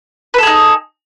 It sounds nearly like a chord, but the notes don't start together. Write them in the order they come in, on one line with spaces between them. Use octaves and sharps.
B4 A4 G#4 D#4